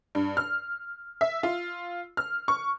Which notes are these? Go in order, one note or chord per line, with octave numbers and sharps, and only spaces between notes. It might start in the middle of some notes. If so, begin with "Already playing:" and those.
G2
F6
E5
F4
F6
C#6